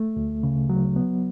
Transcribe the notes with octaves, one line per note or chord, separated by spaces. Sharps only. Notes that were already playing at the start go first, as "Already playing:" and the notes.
Already playing: A3
D2
C#3
F#3
B3